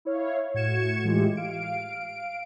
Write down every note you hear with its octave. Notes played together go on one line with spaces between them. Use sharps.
E4 C#5 F5
A2 F#4 G#6 C#7 E7
A2 E3 G#3 A3 F4 G4
F5 D7